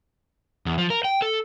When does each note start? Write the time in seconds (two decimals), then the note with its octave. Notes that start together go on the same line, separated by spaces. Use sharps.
0.66 E2
0.78 F3
0.90 A#4
1.05 G5
1.22 A4